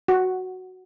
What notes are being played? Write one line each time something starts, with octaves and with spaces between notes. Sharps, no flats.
F#4